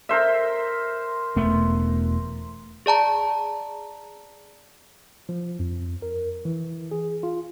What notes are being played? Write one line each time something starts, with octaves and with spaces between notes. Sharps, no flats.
A#4 C5 E5
E1 A3 B3
G#4 D5 A5 A#5
F3
F2
A#4
E3
G#4
F4